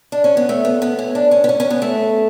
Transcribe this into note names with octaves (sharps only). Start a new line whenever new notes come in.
D4
C#4
B3
A3
B3
B3
C#4
D4
C#4
B3
C#4
C#4
B3
A3